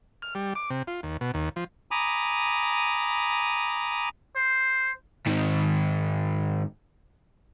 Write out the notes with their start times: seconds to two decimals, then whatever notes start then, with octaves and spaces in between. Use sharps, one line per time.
0.22 F6
0.35 G3
0.55 D6
0.70 C3
0.87 F4
1.03 D#2
1.21 B2
1.34 D#2
1.56 F3
1.91 G#5 A#5 B5 D6 D#6
4.36 C5
5.26 G#2 D#3